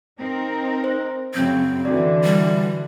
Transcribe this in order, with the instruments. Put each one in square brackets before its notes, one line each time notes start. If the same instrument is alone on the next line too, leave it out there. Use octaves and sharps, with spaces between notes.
[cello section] C4 D#4 A#4
[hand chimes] C5
[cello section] F#2 C#3 F#3 [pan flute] C4 [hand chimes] G6 G#6
[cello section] D3 E3 [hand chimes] F#4 D5
[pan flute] G3